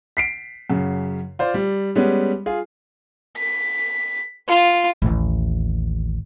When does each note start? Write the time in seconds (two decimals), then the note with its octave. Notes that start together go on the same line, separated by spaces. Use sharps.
0.17 B6 C7 D7
0.70 F#2 C#3
1.39 F4 C5 D5
1.54 G3
1.95 G3 G#3 B3 C#4
2.46 F4 G#4
3.37 B6
4.48 F4
5.02 A1 D#2